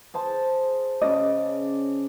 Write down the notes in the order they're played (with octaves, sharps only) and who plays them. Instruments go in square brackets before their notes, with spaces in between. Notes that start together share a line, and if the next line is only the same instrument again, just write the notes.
[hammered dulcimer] G#4 C5 A5
[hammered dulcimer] C#3 D5 [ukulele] C#4 D#5